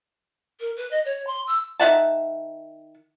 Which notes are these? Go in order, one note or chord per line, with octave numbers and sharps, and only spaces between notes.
A#4
B4
D#5
C#5
C6
E6
D#3 E5 F#5 A5